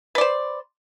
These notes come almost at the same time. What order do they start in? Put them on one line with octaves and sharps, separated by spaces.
B4 D5 C5